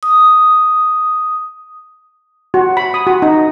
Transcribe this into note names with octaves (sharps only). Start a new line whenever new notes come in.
D#6
F#4
B5
D#6
F#4
D#4